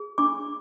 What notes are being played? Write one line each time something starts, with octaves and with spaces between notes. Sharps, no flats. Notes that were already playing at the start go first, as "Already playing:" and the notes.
Already playing: G#4
D4 D6